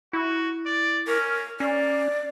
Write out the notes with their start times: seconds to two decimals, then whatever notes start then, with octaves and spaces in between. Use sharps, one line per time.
0.13 E4 F#4
0.66 D5
1.07 C#4 A#4
1.60 A#3 C#4 D5